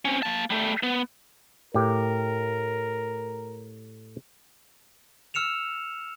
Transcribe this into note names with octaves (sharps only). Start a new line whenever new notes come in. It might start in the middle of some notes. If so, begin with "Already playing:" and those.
C4 C#4
A#3 A5
G3 A3
B3
A2 G4 A#4
E6 F6 C#7 E7 F7